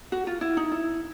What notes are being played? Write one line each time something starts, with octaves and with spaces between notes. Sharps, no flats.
F#4
F4
E4
D#4
E4